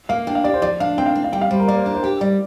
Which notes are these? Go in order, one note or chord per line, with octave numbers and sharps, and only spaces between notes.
A#3 F5
D4 G5
F5
G4 D5
C5
F3 D5
D4 F5
C4 G5
F5
C4
F5
G3 G5
F5
G3 C5
A#4
A#3 D5
C5
D4 A#4
C5
G4 G5
G3 D5